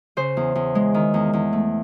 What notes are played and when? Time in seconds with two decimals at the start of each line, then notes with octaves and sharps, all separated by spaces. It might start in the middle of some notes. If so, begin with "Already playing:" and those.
0.17 C#3 C5
0.37 E2
0.55 E2
0.75 G#3
0.94 D#3
1.14 E2
1.33 E2
1.53 A3